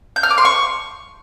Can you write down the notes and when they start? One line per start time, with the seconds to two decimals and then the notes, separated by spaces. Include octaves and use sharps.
0.16 G6
0.23 F6
0.31 D6
0.38 C6
0.45 C#6